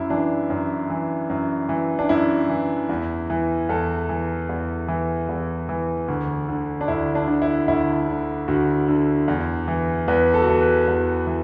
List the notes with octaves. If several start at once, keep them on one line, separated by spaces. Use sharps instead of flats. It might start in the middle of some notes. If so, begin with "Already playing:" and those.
Already playing: F#2 E4
E3 D4
F#2
E3
F#2
E3
D4
F#2 E4
E3
E2
E3
E2 A4
E3
E2
E3
E2
E3
D2
D3
D4
D2 E4
D4
D3
E4
D2 E4
D3
D2 F#4
D3
E2
E3
E2 B4
A4
F#4
E3 A4
B4
E2
E3